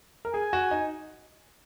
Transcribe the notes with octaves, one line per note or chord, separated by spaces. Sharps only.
A#4
G#4 G#5
F#4
D#4